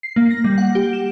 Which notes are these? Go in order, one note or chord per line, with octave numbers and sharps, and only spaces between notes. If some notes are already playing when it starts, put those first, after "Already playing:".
C7
A#3
A#6
G3
F#5
G4
E7